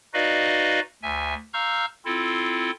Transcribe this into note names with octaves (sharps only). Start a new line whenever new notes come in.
D#4 F#4 B4 D5 D#5 F5
D2 E5 G#5
F5 A#5 C#6 E6 F6 G6
C4 E4 F4 A4